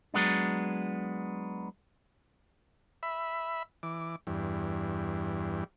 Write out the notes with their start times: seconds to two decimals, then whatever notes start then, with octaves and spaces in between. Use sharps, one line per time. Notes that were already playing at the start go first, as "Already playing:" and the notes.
0.14 F#3 G#3 B3 D4
3.03 E5 B5
3.83 E3 D6
4.27 E2 G2